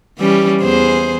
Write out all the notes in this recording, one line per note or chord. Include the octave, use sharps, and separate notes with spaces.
E3 G3 C#4
E2 G#4 C5